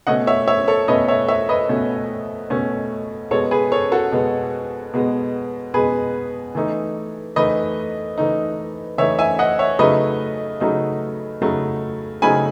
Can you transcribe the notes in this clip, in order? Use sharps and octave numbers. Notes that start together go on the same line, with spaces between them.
B2 A3 C#4 D#5 F#5
C#5 E5
C#5 E5
A4 C#5
B2 A3 C#4 B4 D#5
C#5 E5
C#5 E5
B4 D#5
B2 A3 C#4
B2 A3 C#4
B2 G#3 B3 A4 C#5
G#4 B4
A4 C#5
F#4 A4
B2 G#3 B3
B2 G#3 B3
B2 G#3 B3 G#4 B4
E3 A3 D#4
E3 A3 D#4 B4 D#5
E3 A3 D#4
E3 A3 D#4 C#5 E5
E5 G#5
D#5 F#5
C#5 E5
C#3 F#3 A3 D#4 B4 D#5
C#3 F#3 A3 D#4
C#3 F#3 A3 D#4
C#3 F#3 A3 D#4 G#5 B5